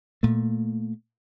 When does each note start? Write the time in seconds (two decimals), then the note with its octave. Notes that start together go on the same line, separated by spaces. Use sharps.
0.23 A#2 A3